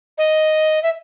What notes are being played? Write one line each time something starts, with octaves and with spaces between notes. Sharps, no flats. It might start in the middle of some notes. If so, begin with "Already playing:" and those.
D#5
E5